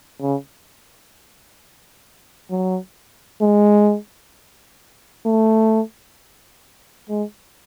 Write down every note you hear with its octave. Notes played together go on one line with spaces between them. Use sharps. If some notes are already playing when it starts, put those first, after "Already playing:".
C#3
F#3
G#3
A3
G#3